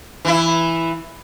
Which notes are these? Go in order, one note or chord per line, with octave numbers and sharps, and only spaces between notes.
E3 E4